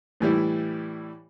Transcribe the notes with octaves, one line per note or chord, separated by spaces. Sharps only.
A2 E3 G3 E4